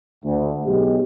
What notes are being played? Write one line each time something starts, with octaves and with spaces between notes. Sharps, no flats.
D2
B1 G#3 G4